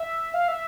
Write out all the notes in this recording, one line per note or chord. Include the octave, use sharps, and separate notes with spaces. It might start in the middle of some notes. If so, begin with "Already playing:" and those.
Already playing: E5
F5
E5